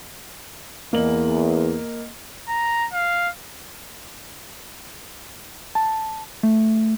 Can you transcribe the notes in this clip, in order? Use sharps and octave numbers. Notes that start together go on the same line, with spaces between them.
E2 A#3 D#5 F#7
A#5
F5
A5
A3